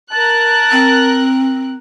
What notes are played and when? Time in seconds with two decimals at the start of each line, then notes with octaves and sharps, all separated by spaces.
0.13 A#4 A5 F#6
0.71 C4